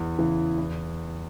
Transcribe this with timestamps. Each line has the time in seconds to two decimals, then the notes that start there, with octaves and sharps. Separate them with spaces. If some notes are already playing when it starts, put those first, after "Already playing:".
Already playing: E2
0.18 C#3 E3
0.58 E2